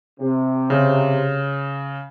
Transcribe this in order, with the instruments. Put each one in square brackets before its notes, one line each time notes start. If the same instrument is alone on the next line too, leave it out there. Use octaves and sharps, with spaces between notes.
[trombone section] C3
[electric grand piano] C#3